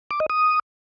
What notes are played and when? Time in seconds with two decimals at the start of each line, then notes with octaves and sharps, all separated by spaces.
0.11 D6
0.20 D#5
0.30 D#6